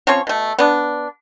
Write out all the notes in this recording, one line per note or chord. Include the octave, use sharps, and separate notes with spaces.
F3 C4 C#4 C#5
B2 A3
B3 D4